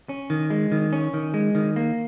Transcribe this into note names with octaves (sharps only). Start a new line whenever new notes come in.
C#4
D#3
G#3
D#3
C#4
D#3
G#3
D#3
A#3